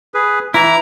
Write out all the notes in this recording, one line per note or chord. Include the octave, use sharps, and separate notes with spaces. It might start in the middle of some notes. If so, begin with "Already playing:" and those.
G#4 B4
E3 E4 A#5